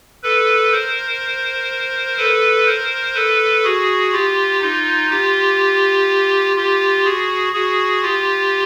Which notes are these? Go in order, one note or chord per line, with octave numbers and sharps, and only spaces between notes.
A4 B4
A#4 C5
A4 B4
A#4 C5
A4 B4
F#4 G#4
F4 G4
D#4 F4
F4 G4
F4 G4
F#4 G#4
F#4 G#4
F4 G4